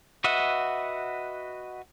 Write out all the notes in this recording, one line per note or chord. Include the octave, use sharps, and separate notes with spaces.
F#4 B4 D#5 E5 F#5